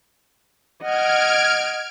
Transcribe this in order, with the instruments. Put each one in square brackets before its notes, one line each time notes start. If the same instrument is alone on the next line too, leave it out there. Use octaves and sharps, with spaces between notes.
[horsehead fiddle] D#5 F#5 [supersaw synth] F6 G#6 D7